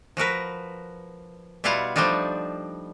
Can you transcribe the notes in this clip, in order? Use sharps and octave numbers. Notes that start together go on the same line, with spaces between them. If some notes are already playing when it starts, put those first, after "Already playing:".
F3 F#4 A#4 B4
B2 G3 E4 F4 F5 F#5
F3 G3 A3 D4 D#4 F4